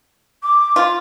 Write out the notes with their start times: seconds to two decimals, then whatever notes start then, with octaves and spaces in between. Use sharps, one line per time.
0.43 D6
0.76 F4